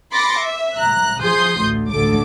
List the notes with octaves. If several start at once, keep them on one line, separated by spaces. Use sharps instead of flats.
B5 C6 D6 A6 A#6 C#7
E5
A#5 F#6
F3 G#4 C6 D#6 G6
A1 D2
A1 D2 A4 D6